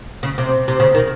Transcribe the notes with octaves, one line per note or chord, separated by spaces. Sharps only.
C#3
C3
C3
C#3
D#3